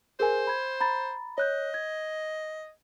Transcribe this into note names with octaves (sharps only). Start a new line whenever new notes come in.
G#4 A#4 C5 G#5
B5 G#6
A#5 B5 A6
C#5 D#5 F#6 G6
G#6